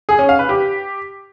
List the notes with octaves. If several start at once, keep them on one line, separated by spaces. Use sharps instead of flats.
G#4
C#4
F5
B4
G4